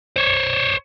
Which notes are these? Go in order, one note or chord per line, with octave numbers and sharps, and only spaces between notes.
C5 C#5